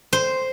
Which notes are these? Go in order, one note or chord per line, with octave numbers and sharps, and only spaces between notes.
C5